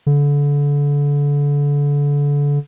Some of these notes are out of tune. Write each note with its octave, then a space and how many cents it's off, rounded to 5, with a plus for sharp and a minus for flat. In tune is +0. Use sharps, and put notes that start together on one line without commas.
D3 -30